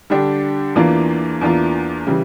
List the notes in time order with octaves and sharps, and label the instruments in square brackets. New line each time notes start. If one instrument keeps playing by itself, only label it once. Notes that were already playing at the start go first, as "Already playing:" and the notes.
[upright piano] D3 G3 D4 G4
E2 E3 A#3 D4 F4
E2 E3 A#3 D4 F4
C#3 E3 G3